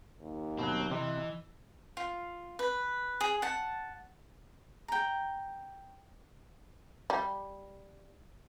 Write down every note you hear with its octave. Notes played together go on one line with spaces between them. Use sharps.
D#2
B2 F#3 C4
C3 E3 D#5
F4
B4
G#4
F#5 A5
G5 A#5
G3